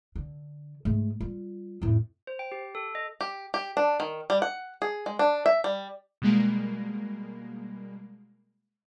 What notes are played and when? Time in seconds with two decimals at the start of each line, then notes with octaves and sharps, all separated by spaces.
0.16 D3
0.85 G#2 A3
1.21 G3 F4
1.82 F2 A2
2.27 C5
2.39 G5
2.52 G4
2.75 A4
2.95 D#5
3.21 G4
3.54 G4
3.77 D4
4.00 D#3
4.30 G3
4.42 F#5
4.82 G#4
5.06 G#3
5.19 D4
5.46 E5
5.64 G3
6.22 B2 G3 G#3 A#3